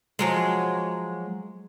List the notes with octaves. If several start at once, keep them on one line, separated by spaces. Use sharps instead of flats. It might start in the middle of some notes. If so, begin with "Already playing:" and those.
F3 F#3 G#3